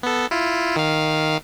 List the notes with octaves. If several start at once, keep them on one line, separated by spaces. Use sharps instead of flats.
B3 A4
E4 F4
D#3 F5